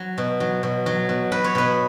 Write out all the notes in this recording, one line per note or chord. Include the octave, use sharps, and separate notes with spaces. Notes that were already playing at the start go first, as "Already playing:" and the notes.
Already playing: F#3
B2
F#3
B2
F#3
B2
F#3 B4
C#5
B2 B4